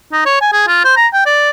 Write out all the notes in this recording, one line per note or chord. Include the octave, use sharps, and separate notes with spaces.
D#4
C#5
G#5
G#4
F4
C5
A#5
G5
D5